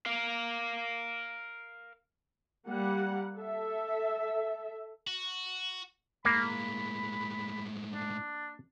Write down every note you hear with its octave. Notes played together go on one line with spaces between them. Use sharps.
A#4 F5
G3 A#3 F#5
A4 E5
F#4
A2 G#3 A#3 B5
D4